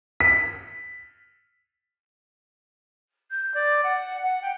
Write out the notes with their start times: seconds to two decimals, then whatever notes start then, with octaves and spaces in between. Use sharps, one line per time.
0.20 B6
3.31 G6
3.54 D5
3.83 F#5
4.22 F#5
4.42 G5